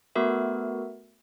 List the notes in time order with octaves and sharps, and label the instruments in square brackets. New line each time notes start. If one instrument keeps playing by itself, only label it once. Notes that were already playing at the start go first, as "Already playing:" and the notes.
[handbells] A3 B3 F#4 A#4 E5